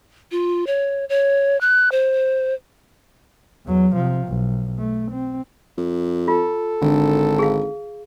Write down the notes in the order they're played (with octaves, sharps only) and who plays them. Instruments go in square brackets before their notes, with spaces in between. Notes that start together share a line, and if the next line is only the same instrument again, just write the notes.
[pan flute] F4
C#5
C#5
F#6
C5
[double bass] E2 F#3
C3 F3
B1
A3
C4
[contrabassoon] F2
[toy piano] F4 [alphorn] A4
[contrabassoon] G#1 [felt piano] D3
[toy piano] G#4 F5